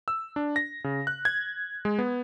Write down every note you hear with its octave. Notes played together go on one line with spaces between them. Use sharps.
E6
D4
A#6
C#3
F#6
G#6
G#3
B3